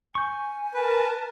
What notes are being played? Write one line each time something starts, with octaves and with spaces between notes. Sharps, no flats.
G#5 C#6 G6
A#4 B4 A5